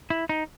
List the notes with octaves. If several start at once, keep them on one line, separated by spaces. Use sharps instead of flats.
E4
D#4